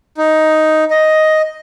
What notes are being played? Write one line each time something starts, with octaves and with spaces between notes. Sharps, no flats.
D#4
D#5